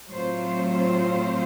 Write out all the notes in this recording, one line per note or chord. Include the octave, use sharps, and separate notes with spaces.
A2 F#3 A3 C4 F4 C5
C5